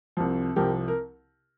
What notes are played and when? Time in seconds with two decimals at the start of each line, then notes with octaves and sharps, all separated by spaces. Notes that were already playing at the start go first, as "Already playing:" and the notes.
0.17 C2 C3 F3
0.56 C2 C3 F3 G4 A#4
0.88 A#4